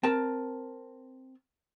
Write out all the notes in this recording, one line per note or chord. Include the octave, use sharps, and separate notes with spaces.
C4 A#4 A5